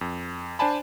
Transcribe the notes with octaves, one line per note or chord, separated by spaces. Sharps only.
F2
D4 C5 D5 G#5 A5 B5